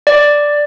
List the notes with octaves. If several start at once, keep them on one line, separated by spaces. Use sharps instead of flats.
D5